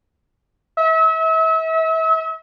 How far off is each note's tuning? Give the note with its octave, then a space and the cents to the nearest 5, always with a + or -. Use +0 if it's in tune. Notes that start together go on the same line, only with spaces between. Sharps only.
E5 -35